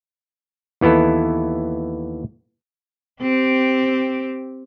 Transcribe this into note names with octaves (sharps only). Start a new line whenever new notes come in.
D#2 E3 B3 E4 A4
C4 G4